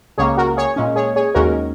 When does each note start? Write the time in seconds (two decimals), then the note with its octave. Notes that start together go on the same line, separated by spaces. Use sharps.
0.18 C#2 C#3 A#3 G#4 C#5
0.37 F#4 A#4
0.57 G#4 C#5
0.76 A#2 G#3 C#4
0.96 G#4 C#5
1.16 G#4 C#5
1.35 D#2 D#3 G#3 C#4 F#4 A#4